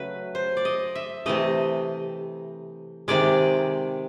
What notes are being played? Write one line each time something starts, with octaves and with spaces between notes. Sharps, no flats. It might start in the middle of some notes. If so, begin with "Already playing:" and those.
Already playing: C#3 F#3 A3 F#4 B4
C5
D5
D#5
E5
C3 E3 A3 D#5
C3 D#3 G#3 D5